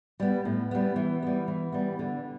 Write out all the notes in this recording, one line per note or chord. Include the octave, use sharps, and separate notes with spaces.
G3 B3
A2
G3 B3
E3
G3 B3
E3
G3 B3
D3